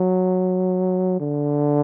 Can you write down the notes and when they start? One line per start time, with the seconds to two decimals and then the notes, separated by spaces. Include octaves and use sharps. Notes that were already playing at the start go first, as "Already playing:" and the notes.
Already playing: F#3
1.20 D3